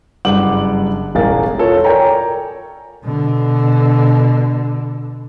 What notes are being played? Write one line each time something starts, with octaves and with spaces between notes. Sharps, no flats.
F#1 G2 F#5 D6 F#7
E1 A1 A#4 F5 G#5 A6
F4 A4 C#5
A#4 C#5 D5 G5 G#5 A#5
B2 D3